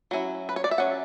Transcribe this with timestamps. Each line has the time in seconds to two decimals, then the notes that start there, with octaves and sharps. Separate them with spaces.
0.11 F#3 C#4 E4
0.49 B4
0.56 C#5
0.64 D5
0.71 E5
0.78 F#3 C#4 F#5